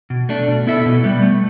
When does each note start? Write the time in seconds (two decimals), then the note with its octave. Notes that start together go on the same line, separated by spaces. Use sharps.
0.10 B2
0.29 A3 D4
0.48 B2
0.67 B3 E4 A4 E5
0.86 B2
1.04 G3 B3
1.22 A3